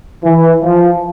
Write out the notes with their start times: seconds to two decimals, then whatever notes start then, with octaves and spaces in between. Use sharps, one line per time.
0.24 E3
0.62 F3